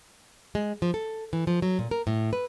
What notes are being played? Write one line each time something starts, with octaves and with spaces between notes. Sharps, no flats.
G#3
F3
A4
E3
F3
F#3
A#2
A#4
A2
B4